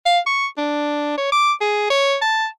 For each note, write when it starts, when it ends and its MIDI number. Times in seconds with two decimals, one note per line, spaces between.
0.06 0.19 77
0.26 0.46 85
0.58 1.15 62
1.18 1.31 73
1.32 1.52 86
1.61 1.88 68
1.90 2.16 73
2.22 2.47 81